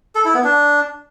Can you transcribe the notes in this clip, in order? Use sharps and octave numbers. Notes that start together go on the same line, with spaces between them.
A4
E4
B3
D4